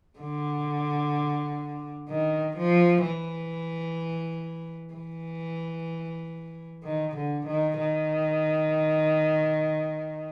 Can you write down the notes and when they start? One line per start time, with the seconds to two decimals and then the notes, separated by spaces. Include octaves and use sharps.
0.20 D3
2.09 D#3
2.57 F3
3.04 E3
4.94 E3
6.84 D#3
7.16 D3
7.47 D#3
7.79 D#3